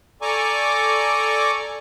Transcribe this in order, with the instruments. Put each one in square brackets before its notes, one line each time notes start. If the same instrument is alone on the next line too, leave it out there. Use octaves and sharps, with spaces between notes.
[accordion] A4 D5 G#5 A#5 C#6 D6